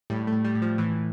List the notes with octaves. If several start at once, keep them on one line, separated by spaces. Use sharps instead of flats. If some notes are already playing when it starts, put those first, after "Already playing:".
A2 G3
A3
A2
G3
A2
F3
A2 E3